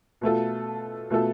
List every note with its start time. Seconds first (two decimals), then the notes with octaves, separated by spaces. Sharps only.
0.21 B2 A3 F4 A4
1.10 B2 A3 F4 A4